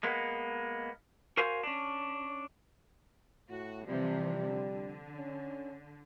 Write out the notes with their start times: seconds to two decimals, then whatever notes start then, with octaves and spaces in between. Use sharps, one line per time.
0.03 G#3 A#3 B3
1.37 F#4 A#4 C5 F5 G#5
1.63 C#4 D4
3.49 A2 F#4
3.86 C3 E3 F3 G3
4.50 D3
5.16 C#4